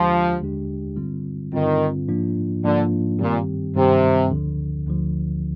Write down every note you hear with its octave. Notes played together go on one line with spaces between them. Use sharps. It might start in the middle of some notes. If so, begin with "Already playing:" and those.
Already playing: D#2 D3 F3 G#3 D4 G4
D#2 D3 G#3 D4 G4
G2 D3 G3 C4 F4
G2 D3 D#3 G3 C4 F4
G#2 F3 A#3 D4 F4
G#2 D3 F3 A#3 D4 F4
G2 A#2 D#3 G3 C4 G4
G2 C3 D#3 G3 C4 G4
D2 D3 F3
D2 D3 F3